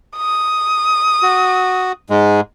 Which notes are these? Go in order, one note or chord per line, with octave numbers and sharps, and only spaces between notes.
D#6
F#4
G#2 G#3